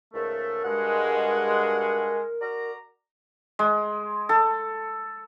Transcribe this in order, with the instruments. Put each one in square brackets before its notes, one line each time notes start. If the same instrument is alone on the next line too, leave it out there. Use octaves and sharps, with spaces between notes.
[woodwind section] C#2 G#2 A3 [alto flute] A#4
[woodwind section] G2 F#4 F#5 [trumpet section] G#3
[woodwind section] F#4 D5 A#5
[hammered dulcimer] G#3
A4